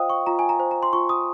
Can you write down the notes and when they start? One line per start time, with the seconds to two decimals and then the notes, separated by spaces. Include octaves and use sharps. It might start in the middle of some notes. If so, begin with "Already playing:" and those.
Already playing: F4 C5 D#5 F5 G5 D#6
0.10 C#6
0.26 F4 A#5
0.39 G#5
0.49 A#5
0.60 C5
0.71 A#5
0.83 C6
0.93 F4 C#6
1.09 D#6